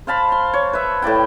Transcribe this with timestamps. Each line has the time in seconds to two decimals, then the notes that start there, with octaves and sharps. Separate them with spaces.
0.07 C5 F5 A5 B5
0.32 C6
0.54 C#5
0.73 B4 E5
1.02 A2 E4 D5 G5